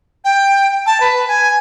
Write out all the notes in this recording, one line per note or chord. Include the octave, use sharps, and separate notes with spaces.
G5
A5
B4
G#5